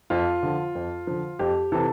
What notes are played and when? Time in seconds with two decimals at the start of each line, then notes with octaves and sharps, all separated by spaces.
0.10 F2 F4
0.43 D3 F3
0.75 F2
1.07 D3 F3
1.39 F2 G4
1.72 C3 E3 A4